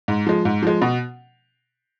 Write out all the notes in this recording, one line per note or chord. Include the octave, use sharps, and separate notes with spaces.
G#2
F3 G#3
G#2
F3 G#3
B2